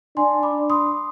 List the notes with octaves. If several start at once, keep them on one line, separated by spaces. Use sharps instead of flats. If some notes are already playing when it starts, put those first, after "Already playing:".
D4 G#5 C6
B5 D6
C6 D#6